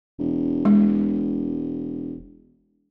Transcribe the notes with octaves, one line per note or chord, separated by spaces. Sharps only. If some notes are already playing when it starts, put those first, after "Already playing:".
E1
G#3